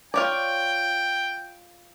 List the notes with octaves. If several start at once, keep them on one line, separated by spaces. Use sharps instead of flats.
F4 C#5 D5 G5